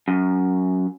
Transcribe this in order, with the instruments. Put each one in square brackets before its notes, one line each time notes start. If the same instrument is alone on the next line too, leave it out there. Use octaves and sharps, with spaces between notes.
[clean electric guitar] F#2